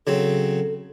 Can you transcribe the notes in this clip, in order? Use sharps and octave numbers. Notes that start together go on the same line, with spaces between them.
C#3 F#3 C4 A4